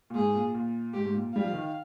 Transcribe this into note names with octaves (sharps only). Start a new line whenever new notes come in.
A#2
G#2 G#4
A#2
A#2
G#2 G4
G#2
A#2
G3 F5
F3
D#3